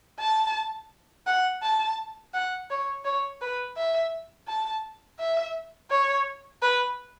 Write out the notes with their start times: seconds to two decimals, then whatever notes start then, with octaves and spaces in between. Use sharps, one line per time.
0.20 A5
1.27 F#5
1.63 A5
2.34 F#5
2.70 C#5
3.05 C#5
3.41 B4
3.77 E5
4.48 A5
5.19 E5
5.91 C#5
6.62 B4